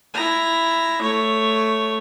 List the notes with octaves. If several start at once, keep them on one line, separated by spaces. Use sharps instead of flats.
E4 A#5
A3 C#5